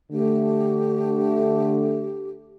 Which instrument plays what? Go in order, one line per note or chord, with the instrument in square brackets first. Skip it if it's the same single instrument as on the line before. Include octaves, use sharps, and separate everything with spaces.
[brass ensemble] D3 A3 [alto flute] G4